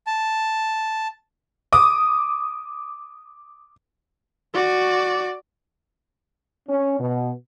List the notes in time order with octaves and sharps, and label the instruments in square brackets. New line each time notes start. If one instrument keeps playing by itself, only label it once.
[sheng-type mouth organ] A5
[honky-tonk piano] D6 D#6
[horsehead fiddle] F#4 D5
[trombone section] C#4
B2